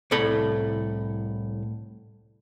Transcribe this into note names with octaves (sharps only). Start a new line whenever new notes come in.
C2 A2 A4 B5